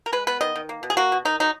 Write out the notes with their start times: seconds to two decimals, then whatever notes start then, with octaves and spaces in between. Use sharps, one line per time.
0.06 A#4
0.12 G#3 B4
0.27 B3 B4
0.41 D#3 D#5
0.56 D#3
0.69 A#3
0.83 B2
0.90 G#4
0.97 A#3 F#4
1.12 B2
1.25 D#3 D#4
1.40 F#3 D#4